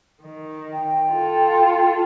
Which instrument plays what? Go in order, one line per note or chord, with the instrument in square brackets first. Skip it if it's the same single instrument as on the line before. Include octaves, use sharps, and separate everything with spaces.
[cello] D#3
[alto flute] G5
[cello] F4 A4